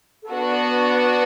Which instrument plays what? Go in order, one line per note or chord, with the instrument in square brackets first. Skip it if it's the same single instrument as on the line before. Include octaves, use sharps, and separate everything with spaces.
[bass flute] A4
[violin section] B3 D4 F#4 [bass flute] B4